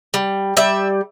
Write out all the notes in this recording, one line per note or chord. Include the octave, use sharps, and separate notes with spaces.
G3
G3 E5